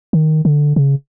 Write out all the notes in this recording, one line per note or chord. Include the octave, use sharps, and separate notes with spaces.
D#3
D3
C#3